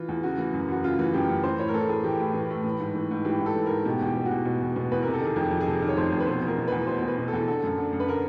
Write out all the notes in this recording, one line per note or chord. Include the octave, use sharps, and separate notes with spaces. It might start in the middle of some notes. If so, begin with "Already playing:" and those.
Already playing: E3 F4
E2
C#3 F#4
E3
F#2
F#2 F#4
C#3 F4
E3
F#2 G4
F#2
E3 C5
A2 C#5
A#4
E3 A4
A2 G#4
E3 G4
A2
E3
A2
E3
G#2
E3
G#2
E3 G4
G#2
A4
E3
G#2 A#4
B2 G4
E2
G4
B2
F#4
E2
B2
E2
B2
E2 B4
C3 A#4
A4
D#3 G#4
F2 G4
F2
G#4
C3 A4
D#3
C#5
F2 C5
F2
B4
B2 C5
E2
A#4
B2
E2 B4
B2 C5
E2
B4
B2
A4
E2
D3 A4
F#2
D3
F#2
B4
D3 A#4